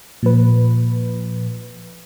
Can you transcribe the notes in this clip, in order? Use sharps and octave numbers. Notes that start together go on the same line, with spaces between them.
A#2 F3 B4